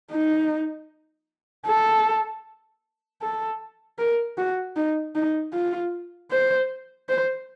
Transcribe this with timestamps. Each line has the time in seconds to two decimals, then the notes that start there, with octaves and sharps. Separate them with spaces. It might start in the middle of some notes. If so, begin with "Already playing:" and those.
0.11 D#4
1.67 A4
3.22 A4
3.99 A#4
4.38 F#4
4.76 D#4
5.16 D#4
5.54 F4
6.31 C5
7.09 C5